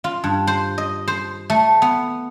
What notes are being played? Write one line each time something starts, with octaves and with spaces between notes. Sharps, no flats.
F4
G2
C5
D#5
C5
A3
B3